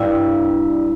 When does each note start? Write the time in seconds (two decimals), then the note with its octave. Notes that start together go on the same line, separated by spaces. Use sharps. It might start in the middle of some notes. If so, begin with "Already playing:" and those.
Already playing: G2 E4